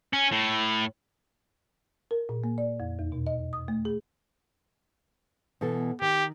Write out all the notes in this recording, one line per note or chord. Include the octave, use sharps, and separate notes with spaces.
C#4
A2
A#4
A#2
A#3
D5
F2
E2
B2
D#5
D#6
A3
G#4
B2 E3 A4
D#3 G4